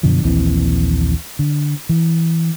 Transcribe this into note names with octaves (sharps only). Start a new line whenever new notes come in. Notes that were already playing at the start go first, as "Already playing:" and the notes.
F#2 B2 D3 F3
A#1 D#2 E3 C4
D3
E3